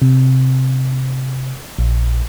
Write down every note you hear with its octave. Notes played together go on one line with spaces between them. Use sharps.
C3
A#1